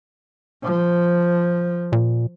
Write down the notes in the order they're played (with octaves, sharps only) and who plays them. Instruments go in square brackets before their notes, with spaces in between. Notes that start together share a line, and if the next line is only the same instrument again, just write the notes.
[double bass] F3
[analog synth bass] A#2